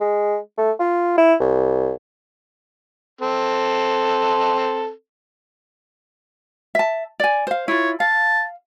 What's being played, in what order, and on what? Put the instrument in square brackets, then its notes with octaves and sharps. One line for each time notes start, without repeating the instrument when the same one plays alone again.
[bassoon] G#3
A3
F4
E4
C2
[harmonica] C4 A4
[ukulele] E5 A5
D5 G#5
C5 F5
[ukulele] E4 F4 [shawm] C#5
[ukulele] F5 [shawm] A5